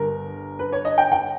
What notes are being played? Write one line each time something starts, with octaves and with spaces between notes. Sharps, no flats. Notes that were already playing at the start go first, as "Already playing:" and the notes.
Already playing: G1 G2 G3 A#4
B4
C#5
D#5
G5
G5